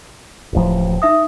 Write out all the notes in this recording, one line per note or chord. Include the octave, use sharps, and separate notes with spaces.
D1 A1 F3
D#4 E5 D#6